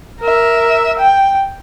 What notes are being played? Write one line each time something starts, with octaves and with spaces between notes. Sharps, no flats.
A#4 E5
G5